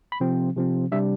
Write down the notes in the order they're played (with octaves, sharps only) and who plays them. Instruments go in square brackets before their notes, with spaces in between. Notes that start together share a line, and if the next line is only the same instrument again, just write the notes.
[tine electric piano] B5
C3 F3 C4
C3 F3 C4
C3 G3 D4 E5